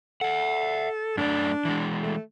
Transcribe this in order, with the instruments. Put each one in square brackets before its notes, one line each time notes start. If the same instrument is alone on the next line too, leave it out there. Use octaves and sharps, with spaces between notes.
[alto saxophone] A4 [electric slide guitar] E5 F#5
[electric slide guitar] F#2 A3 D5 [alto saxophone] D4
[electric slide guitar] E3 G#3
[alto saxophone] A3